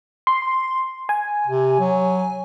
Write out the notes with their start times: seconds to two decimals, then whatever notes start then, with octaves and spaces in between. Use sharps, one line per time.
0.27 C6
1.09 G#5
1.47 C3
1.79 F#3